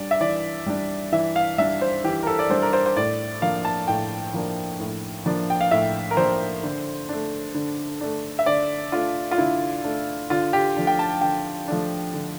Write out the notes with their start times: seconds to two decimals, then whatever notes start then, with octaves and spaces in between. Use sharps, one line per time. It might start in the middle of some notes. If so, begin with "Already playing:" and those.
Already playing: G3 D4 D5
0.11 E5
0.21 E3 D5
0.66 G3 D4
1.12 E3 E5
1.36 F5
1.58 G3 D4 E5
1.81 C5
2.04 E3 G4
2.23 A#4
2.27 A4
2.39 D5
2.50 G3 D4 C5
2.62 A#4
2.73 C5
2.86 C5
2.96 A2 D5
3.42 F3 A#3 D4 F5
3.65 A5
3.88 A2 G5
4.34 F3 A#3 D4
4.80 A2
5.26 F3 A#3 D4
5.50 G5
5.61 F5
5.71 A2 E5
6.11 A#4
6.17 F3 A#3 D4 C5
6.63 D3
7.09 A3 D4
7.55 D3
8.01 A3 D4
8.39 E5
8.46 D3 D5
8.92 A3 D4 F4
9.31 F4
9.38 D3 E4
9.84 A3 D4
10.30 D3 F4
10.53 G4
10.76 F3 A3 D4
10.87 G5
10.99 A5
11.21 D3 G5
11.68 F3 A3 D4
12.14 D3